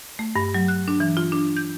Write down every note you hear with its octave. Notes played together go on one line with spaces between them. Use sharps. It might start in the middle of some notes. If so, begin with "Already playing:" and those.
A3
G2
F#3
F#6
D4
E3
F4
D4
G6